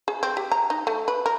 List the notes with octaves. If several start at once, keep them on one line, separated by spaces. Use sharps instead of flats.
G#4
C4
G4
A#5
D#4
A3
B4
A#4